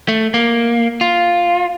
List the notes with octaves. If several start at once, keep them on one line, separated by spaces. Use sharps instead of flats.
A3
A#3
F4